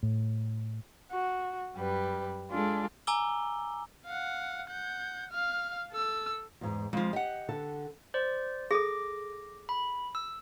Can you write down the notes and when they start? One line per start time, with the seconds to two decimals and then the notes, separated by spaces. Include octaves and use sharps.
0.03 A2
1.10 F#4
1.74 F#2 G3 B4
2.49 G#3 D4 F4 G#4 A4
3.07 G#5 A#5 D6 E6 G7
4.06 F5 F#5
4.68 F#5 G6
5.31 F5 F6
5.92 A4 E6
6.61 E2 G#2
6.93 F2 F3 G#3
7.13 G4 D#5 F#5
7.49 D3 A4
8.14 C5 D5
8.71 G#4 A4 D6 A#6
9.69 B5
10.15 E6